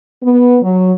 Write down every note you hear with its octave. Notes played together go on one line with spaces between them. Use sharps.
B3
F#3